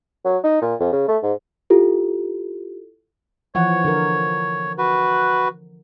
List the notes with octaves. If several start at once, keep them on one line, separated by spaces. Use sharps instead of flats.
F#3
D#4
A#2
F2
C#3
A3
G#2
E4 F4 G4 A4
E3 F3 C#5 F#5
D3 A#4
F#4 B4